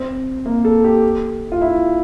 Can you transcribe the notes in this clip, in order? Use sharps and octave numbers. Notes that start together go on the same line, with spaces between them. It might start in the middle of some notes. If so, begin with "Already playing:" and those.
Already playing: C4
A#3
A4
G4
F4
E4